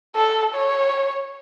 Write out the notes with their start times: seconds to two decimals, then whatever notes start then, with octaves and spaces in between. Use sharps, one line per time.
0.16 A4
0.55 C#5